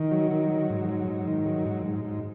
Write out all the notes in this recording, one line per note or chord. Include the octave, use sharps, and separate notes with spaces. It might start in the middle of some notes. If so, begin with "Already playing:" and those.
Already playing: D#3
F#3
D#3
F#3
G#2
F#3
G#2
D#3
F#3
G#2
G#2
G#2